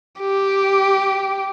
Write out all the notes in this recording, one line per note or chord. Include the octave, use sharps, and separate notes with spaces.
G4